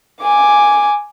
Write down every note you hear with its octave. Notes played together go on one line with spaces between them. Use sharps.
G#5 D6